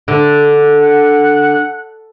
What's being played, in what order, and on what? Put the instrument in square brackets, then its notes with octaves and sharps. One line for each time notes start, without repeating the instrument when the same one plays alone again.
[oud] D3
[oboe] F#5